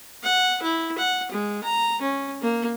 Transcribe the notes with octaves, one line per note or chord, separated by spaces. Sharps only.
F#5
E4
F#5
G#3
A#5
C#4
A#3